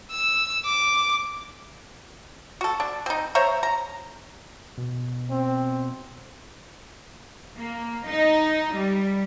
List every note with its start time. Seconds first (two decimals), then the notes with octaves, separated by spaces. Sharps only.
0.11 E6
0.66 D6
2.61 F#4 A4
2.80 D4
3.06 C4 D#4
3.35 C5 C#5 E5 A#5
3.63 A#5
4.78 B2
5.30 C4
7.59 A#3
8.07 D#4
8.75 G3